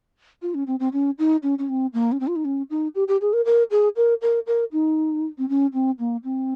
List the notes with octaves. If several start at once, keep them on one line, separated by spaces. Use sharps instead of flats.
F4
C#4
C4
C4
C#4
D#4
C#4
C#4
C4
A#3
C#4
C4
F4
D#4
C#4
D#4
G4
G4
G#4
A#4
A#4
G#4
A#4
A#4
A#4
D#4
C4
C#4
C4
A#3
C4